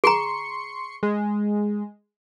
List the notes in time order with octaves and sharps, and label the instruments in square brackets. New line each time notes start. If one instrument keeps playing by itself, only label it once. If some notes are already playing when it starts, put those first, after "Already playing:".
[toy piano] G#4 A#5 [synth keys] C6 C#6 C#7
[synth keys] G#3